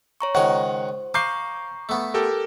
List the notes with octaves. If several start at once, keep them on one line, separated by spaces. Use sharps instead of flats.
C#5 A#5 C#6
C#2 D#3 C5 F#5 G#5
F5 A#5 C#6 D6 G6 C7
A3 B3
G4 A4 A#4